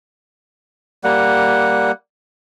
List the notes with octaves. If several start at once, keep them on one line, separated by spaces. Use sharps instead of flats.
G3 A#3 F#5